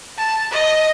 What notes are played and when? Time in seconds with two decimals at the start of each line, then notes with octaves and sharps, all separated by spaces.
0.18 A5
0.52 D#5